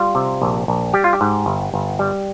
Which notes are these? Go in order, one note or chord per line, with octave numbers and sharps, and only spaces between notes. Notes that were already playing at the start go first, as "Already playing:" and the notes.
Already playing: G3 F4
C3
A#1
A#1
G3 G4
F4
G4
G#2
G1
G1
G3